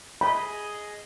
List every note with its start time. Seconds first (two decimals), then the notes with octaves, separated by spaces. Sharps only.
0.21 G#4 D#5 B5